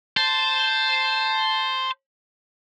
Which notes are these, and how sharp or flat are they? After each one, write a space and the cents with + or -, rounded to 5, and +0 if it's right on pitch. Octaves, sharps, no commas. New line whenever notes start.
C5 +0 A5 +0